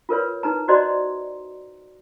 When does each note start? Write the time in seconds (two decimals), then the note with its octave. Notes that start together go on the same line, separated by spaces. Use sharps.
0.09 F4 A#4 B4 C#5
0.43 D#4 B4 A#5
0.68 F#4 C5 D5 D#5 A#5 C6